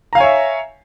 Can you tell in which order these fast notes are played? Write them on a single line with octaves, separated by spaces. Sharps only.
A#5 F5 G#5 C#5 E5